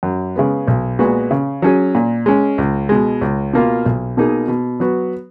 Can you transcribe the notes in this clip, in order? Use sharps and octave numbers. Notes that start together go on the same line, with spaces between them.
F#2
C#3 G#3 B3
B1
A#2 G#3 B3 F#4
C#3
F#3 C#4 G#4
A#2
G#3 C#4
C#2
B2 G#3
C#2
B2 A#3 F4
B1
B2 A#3 D#4 G#4
B2
F#3 B3 F#4